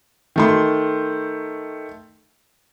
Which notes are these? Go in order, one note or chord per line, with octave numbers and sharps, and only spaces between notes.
D#3 A3 C6